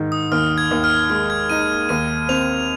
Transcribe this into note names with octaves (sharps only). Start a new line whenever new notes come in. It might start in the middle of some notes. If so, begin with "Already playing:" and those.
Already playing: G#2 D#3
D#6
D#2 F6
G#6
D#2
F6
G#3 F6
G#6
D#4 D#7
D#2 D#7
C4 F7